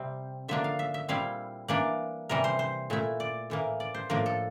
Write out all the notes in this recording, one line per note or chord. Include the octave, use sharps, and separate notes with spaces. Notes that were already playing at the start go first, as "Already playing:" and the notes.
Already playing: C3 G3 C4
D3 F3 A#3 D4 E5
F5
E5
E5
A#2 G3 C4 E4 F5
E3 A#3 D4 D5
C3 E3 G3 A#4
C5
C5
A#2 A3 E4
D5
A2 E3 A#3
D5
C5
A2 F3 A#3 D4 A#4
A4